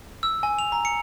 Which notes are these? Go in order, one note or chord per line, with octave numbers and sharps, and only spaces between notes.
E6
G#5
F7
A#5
C#7